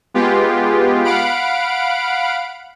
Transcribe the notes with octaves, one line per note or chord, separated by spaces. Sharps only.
G#3 B3 F4 G4
F5 F#5 B5 D7